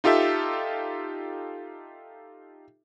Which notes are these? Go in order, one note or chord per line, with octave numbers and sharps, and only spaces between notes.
D#4 F4 G4 A4 E5